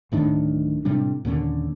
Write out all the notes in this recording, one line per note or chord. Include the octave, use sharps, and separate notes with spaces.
D1 A2 D#3 D4
A2 C3 G3 D4
D#2 A#2 D3 C#4